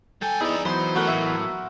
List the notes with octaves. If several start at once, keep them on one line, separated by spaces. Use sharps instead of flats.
G2 A4 G5 G#5
B3 D#4 E4 G#4 D5
E3 F#3 B3 C5 B5 C6
A3 F#4 A#4 F#5
A2 E5